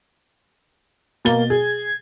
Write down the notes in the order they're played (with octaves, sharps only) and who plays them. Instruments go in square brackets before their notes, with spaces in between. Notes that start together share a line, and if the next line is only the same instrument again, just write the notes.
[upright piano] B2 A6 G7 [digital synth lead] A#3
[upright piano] G#4 [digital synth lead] G#6